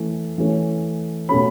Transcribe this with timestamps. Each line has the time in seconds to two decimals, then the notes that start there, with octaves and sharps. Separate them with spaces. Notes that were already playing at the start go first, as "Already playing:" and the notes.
Already playing: E3 A3 C#4
0.38 E3 A3 C#4
1.29 B2 A3 C#4 B5